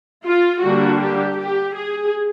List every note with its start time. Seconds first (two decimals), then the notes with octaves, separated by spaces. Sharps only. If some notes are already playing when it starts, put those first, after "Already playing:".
0.25 F4
0.63 D3 G3 A#3 D4 F#4
1.01 G4
1.38 G4
1.76 G#4